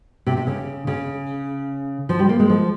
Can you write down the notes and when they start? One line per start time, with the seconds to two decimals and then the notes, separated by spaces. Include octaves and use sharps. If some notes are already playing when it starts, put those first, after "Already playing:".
0.27 C3
0.37 C3
0.47 C#3
0.87 C#3
2.09 F3
2.19 G3
2.29 A#3
2.39 G#3
2.50 F3